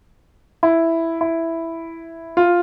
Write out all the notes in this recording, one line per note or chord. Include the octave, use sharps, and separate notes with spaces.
E4
E4
F4